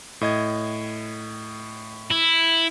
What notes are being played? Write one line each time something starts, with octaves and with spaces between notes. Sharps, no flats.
A2 D#5 G#6
E4